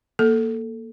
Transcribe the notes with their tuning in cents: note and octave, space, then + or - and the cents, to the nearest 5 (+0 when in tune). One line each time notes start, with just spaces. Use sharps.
A#3 +0 A4 +0